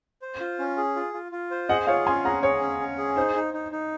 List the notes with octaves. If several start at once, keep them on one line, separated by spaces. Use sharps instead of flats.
C5
F4
C#4
G#4
F4
F4
F4
C5
G#4 D#5 F#5
F4 C#5 F5
C#4 G#5 C6
G#4 F#5 A#5
G#4 C#5
C#4
C#4
G#4
D#4 C5
D#4
D#4
D#4